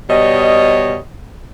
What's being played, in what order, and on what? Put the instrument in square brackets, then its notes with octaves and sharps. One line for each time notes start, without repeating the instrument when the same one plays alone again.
[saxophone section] B2 G3 C#5 D#5